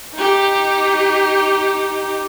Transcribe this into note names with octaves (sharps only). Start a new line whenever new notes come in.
D#4 G4